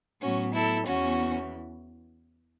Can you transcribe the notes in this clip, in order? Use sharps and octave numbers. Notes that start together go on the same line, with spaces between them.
A2 F#3 B3 C#4 F#4
E4 A4
E2 E3 B3 C#4 F#4